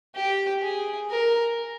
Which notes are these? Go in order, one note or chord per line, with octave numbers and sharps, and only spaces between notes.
G4
G#4
A#4